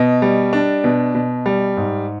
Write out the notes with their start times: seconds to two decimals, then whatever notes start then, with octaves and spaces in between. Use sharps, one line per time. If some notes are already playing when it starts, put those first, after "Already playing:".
Already playing: B2 D#5
0.22 G3
0.53 D4
0.84 B2
1.15 B2
1.46 G3
1.77 G#2